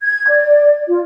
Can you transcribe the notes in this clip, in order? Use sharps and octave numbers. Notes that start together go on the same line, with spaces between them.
G#6
D5
F4